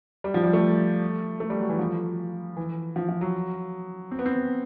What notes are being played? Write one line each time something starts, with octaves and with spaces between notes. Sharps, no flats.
G3
F3
G3
A3
A3
G3
F#3
E3
F3
E3
F3
F3
F#3
C4
B3
C4